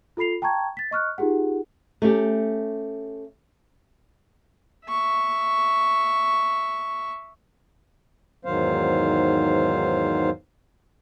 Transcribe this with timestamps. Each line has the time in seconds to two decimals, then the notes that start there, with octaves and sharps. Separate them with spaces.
0.17 F4 A4 B5 C7 F7
0.42 G5 A5 A#5 C#6 G#6
0.77 A6 B6
0.91 D#5 C#6 F6 F#6
1.18 D#4 F4 G4 G#4 F#5
2.02 A3 C#4 G4
4.87 E5 C#6
8.45 E2 G#2 D#3 F#3 C5 F5